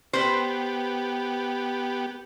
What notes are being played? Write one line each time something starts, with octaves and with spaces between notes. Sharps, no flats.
B3 G4 B4 C5